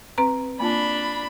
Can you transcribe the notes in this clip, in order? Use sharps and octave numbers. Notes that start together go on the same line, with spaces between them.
C4 B4 A#5
A#3 D4 F4 A5 B5